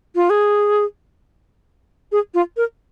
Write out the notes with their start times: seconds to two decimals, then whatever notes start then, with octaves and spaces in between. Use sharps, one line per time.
0.15 F4
0.30 G#4
2.12 G#4
2.34 F4
2.57 A#4